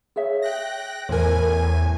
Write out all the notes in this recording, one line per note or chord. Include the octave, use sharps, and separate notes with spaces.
G#4 C#5 E5
G5 F#6 A#6
E2 A2 A#4 C5 G#5